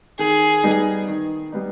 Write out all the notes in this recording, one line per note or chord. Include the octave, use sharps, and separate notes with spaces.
D#3 G#4
G3 B3 D#4
D#3
G3 B3 D#4